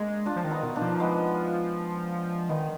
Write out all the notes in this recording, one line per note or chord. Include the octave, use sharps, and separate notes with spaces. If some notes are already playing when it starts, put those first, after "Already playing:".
Already playing: G#3 A#3 D4
D4 F4
F3
D#3
B3 D#4
B2
A#3 D4
F3
G#3 B3
D#3 G#3 B3